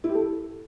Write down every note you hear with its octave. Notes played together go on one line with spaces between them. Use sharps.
E4
G4
A4